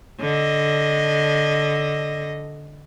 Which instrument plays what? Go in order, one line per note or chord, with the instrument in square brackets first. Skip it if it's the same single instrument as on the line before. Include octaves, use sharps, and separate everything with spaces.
[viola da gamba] D3 D#5